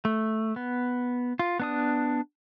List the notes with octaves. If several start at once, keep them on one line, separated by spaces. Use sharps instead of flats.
A3
B3
F4
B3 D4 D#6